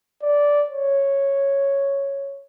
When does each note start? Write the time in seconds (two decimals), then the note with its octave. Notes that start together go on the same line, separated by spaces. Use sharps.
0.22 D5
0.68 C#5